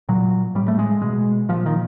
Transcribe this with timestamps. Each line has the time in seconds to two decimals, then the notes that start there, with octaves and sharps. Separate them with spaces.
0.09 A#2 F#3
0.55 A2 G3
0.68 A3
0.79 G#3
1.02 B2 G#3
1.49 A#2 F3
1.66 D#3